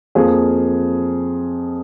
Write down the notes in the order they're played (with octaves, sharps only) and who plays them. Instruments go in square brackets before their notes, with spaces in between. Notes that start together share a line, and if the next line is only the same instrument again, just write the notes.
[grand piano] F2 F3 A#3 G#4